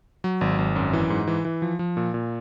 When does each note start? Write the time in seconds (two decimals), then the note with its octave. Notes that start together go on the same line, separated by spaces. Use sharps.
0.24 F#3
0.41 G#1
0.58 G#1
0.76 F#2
0.93 E3
1.10 G#2
1.27 E3
1.45 E3
1.62 F3
1.79 F3
1.97 A#2
2.14 A#2